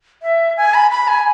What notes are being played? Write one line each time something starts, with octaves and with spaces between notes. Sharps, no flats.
E5
G#5
B5
B5
G#5